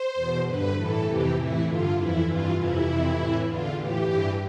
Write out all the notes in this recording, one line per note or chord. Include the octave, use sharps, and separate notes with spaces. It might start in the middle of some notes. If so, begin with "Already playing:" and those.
Already playing: C5
E2 B2
G2 D3 B4
A2 E3 A4
F2 C3 E3 G4
A2 E3 E4
G2 D3 F4
F2 E3 E4
G2 E3 F4
F2 C3 E3 E4
F2 C3 E3
A2 E3
E2 D3 F4
A2 E3 G4
G2 E3